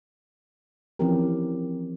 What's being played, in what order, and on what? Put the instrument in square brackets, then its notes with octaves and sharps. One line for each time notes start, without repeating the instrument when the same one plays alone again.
[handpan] E3 F3 C4 C#4 G4 A#4